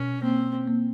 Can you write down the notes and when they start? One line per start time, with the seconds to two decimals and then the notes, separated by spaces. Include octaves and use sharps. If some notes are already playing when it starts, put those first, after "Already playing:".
Already playing: B2 C#4
0.22 A#3 C4
0.68 A#3